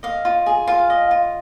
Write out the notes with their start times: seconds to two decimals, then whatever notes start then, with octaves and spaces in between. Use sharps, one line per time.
0.03 D#5 F5
0.25 F4
0.46 G#4
0.67 F4 F5
0.90 D#5
1.11 F4